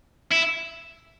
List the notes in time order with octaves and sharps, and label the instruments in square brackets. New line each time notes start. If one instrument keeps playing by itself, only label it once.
[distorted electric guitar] E4